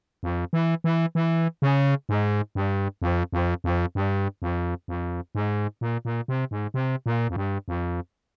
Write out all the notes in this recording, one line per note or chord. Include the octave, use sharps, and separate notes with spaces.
F2
E3
E3
E3
C#3
G#2
G2
F2
F2
F2
G2
F2
F2
G#2
A#2
A#2
C3
G#2
C3
A#2
F2
G2
F2